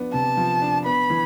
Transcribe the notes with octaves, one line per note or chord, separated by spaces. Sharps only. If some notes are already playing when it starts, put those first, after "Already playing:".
Already playing: F3 B3 D4
C3 A5
F3
D4
B3 B5
E3